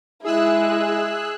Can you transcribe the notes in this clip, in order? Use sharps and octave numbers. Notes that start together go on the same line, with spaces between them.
G#3 E4 G#4 E6 F#6